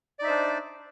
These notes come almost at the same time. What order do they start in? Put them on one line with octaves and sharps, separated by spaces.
D5 D#4 E5 C5 D4